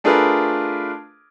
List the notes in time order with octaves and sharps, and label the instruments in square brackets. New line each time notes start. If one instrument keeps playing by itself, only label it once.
[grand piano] A3 D4 F4 G#4 A#4 B4